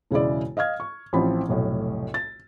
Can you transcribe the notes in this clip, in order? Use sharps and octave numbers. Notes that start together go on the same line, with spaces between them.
E1 C#3 G#3 E4 D5
D#5 F5 F6 G#6
C#6
A1 F3 C4 E4 B5
F1 B1 A2
A6